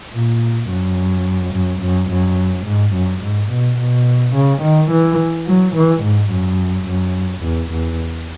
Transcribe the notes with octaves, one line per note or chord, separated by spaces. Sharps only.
A#2
F#2
F#2
F#2
F#2
G#2
F#2
G#2
B2
B2
C#3
D#3
E3
F#3
E3
G#2
F#2
F#2
E2
E2